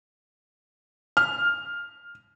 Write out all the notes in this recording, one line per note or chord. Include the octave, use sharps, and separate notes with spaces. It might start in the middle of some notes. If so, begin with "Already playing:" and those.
F6